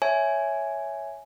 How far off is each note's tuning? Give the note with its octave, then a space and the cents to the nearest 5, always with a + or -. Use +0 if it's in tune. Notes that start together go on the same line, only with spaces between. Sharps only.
C#5 +0 E5 +0 G#5 +5